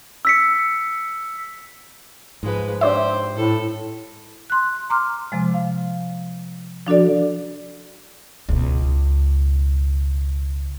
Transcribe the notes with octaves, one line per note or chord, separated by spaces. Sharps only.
E6 B6 C#7
G#2 F3 G#3 B4
D4 G4 C5 C#5 E5
A2 A4
C6 F#6
A#5 C6 D6 F6
C3 F3 G#3
F5
F3 D4 F#4 A4 D5
C#2 B2